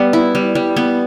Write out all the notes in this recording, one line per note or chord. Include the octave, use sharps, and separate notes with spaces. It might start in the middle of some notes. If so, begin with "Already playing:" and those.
Already playing: G3 B3
E4
G3
G3
B3